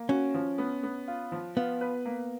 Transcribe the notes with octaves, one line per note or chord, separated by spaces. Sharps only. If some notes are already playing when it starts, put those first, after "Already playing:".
Already playing: A#3
C#4 F#4
F3
B3
B3
F4
F3
B3 F4
B4
A#3